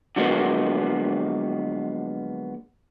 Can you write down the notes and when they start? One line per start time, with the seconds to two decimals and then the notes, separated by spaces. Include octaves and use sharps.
0.16 D3 F3 F#3 G#3 A#3 B3